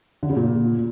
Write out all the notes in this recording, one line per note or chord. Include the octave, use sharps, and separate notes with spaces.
D3
C#3
A#2